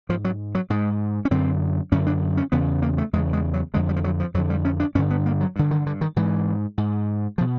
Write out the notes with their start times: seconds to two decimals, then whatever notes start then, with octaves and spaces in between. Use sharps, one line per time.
0.09 G#2 F3
0.25 F#3
0.55 F#3
0.70 G#2 G#3
1.25 C#4
1.31 F#2 D3 C4
1.92 F#2 D3 C#4
2.07 D4
2.37 C#4
2.52 E2 C#3 B3
2.82 A#3
2.98 A3
3.13 E2 G#3
3.17 C#3
3.33 G#3
3.53 F#3
3.74 F2 D3 G#3
3.89 G3
3.96 F3
4.04 F#3
4.20 F3
4.34 F2 F#3
4.38 D3
4.50 G3
4.65 C#4
4.80 D4
4.95 G2 C#4
4.98 D3
5.10 B3
5.26 A#3
5.41 F#3
5.56 G2 D3
5.71 D#3
5.86 D3
6.01 D#3
6.16 G#2 E3
6.78 G#2
7.38 B2 F3